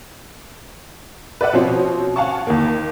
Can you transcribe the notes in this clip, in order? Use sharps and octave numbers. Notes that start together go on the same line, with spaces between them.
B4 D5 E5 F#5
B2 F3 C4 C#4
F5 F#5 G#5 A5 C#6
D#2 A#3